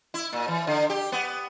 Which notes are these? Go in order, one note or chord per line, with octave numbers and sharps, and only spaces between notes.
E4
A#2
E3
D3
G4
B3